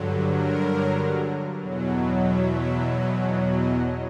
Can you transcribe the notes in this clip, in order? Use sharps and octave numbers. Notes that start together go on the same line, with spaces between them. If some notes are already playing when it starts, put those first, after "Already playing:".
Already playing: G2 D3 F#3
A#4
E2 B2 F#3
E5
E5
D#5
D#5